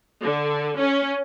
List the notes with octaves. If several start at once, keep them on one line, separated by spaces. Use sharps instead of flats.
D3
C#4